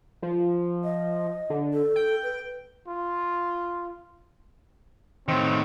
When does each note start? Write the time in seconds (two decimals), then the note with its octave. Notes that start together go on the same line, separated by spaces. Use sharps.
0.22 F3
0.84 D#5
1.50 D3
1.74 A4
1.96 G5
2.23 B4
2.88 F4
5.28 A2 D#3 C4